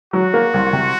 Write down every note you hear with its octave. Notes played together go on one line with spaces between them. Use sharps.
F#3 F#4
A#3
C2
C3